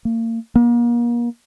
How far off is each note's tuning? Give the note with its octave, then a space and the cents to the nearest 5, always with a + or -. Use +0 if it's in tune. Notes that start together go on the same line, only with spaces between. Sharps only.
A#3 -35
A#3 +35